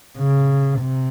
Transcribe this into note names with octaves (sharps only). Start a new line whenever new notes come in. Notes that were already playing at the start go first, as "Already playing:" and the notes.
C#3
C3